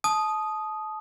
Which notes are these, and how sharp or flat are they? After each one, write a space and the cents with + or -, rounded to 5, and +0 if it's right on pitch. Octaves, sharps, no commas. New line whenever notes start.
A5 -30 D#6 +0